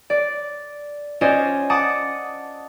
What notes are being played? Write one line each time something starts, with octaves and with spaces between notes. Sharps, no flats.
D5
C#4 F4 C5 D5 D#5
F#5 A5 D6 D#6